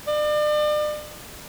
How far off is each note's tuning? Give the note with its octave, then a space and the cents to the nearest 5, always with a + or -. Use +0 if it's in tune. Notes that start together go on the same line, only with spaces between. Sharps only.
D5 +40